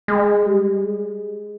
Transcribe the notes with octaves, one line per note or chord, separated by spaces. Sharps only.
G#3
G3
G#3